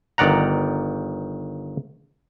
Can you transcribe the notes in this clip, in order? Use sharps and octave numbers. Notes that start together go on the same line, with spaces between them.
G1 D#3 D5 F#5 A#5